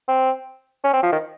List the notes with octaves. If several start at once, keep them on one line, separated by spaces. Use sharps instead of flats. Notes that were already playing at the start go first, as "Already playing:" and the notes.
C4
C#4
C4
F3
D#3